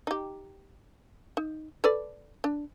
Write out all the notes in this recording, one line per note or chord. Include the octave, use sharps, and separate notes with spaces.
D#4 G4
D#4
A4 B4 D5
D4